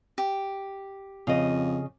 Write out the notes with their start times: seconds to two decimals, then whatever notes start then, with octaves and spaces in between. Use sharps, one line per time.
0.18 G4
1.27 F2 C#3 D#5